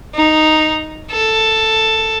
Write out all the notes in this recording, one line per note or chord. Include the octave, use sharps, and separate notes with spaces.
D#4
A4